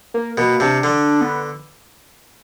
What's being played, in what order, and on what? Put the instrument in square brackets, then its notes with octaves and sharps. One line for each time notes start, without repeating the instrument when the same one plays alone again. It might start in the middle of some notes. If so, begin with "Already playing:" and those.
[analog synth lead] A#3
[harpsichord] B2 [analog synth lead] A#3
[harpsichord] C3 [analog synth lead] D4
[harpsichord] D3
[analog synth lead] B3